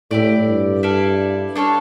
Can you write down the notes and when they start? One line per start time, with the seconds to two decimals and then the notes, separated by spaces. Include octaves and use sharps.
0.11 A2 E4 G4 D5
0.47 G2
0.83 E4 A4 D5 F5
1.55 D4 A4 C#5 F5